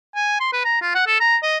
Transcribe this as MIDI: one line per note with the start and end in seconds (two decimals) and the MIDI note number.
0.16 0.39 80
0.40 0.52 84
0.53 0.61 71
0.65 0.79 82
0.82 0.93 65
0.95 1.06 78
1.07 1.18 69
1.20 1.37 82
1.43 1.58 75